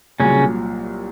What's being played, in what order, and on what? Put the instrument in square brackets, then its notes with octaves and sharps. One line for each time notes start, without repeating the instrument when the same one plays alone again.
[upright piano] C2 A#2 F#3 [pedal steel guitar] C#3 C#4